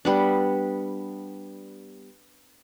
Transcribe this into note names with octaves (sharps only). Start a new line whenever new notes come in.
G3 B3 D4